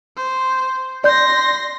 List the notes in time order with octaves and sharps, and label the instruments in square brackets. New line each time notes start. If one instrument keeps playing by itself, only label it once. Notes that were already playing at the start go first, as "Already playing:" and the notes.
[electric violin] C5
[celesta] D5 G6 [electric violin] C6 A#6